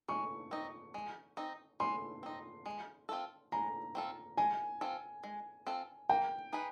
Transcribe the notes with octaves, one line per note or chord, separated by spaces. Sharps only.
G#3 C#6
C4 D#4
G#3
C4 D#4
G#3 C6
C4 D#4
G#3
C4 F4 A4
G#3 A#5
C4 F4 A4
G#3 G#5
C4 F4 A4
G#3
C4 F4 A4
A#3 G5
D#4 G#4 B4